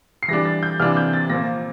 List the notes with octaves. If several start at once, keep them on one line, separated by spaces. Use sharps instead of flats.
C7
E3 G3 D4 A#6
A6
G6
C3 E3 A#3 D4 F6
G6
A6
A#2 F3 A#3 A#6